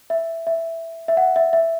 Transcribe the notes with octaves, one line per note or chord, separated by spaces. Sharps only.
E5
E5
E5
F#5
E5
E5